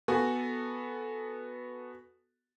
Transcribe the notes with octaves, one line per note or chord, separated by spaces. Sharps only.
B3 F#4 A4 G#5